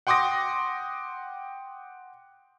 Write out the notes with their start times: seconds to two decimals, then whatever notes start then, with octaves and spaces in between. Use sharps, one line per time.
0.07 F#5 G5 C6 D6 D#6 A#6